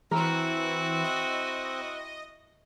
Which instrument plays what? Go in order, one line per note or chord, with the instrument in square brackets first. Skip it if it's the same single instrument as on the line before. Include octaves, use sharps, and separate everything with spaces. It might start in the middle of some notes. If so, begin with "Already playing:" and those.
[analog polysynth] E3 [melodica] C4 [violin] E4 F#4 [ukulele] A#4
[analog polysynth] D#5